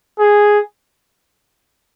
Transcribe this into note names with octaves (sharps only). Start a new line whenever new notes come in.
G#4